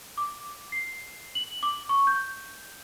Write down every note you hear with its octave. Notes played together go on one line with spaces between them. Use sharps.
D6
C7
F#7
D6
C#6
G6